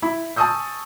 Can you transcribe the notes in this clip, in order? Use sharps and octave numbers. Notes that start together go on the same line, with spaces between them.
E4 B5
G#5 A5 C#6 D#6 E6 G6